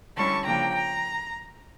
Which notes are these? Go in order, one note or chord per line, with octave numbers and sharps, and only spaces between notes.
D3 G3 C#4 E4 A5 C#6
C#3 F3 A#3 D4 G5 A#5
A#5